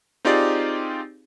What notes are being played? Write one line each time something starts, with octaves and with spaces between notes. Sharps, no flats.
C4 D#4 F4 G4 G#4 D5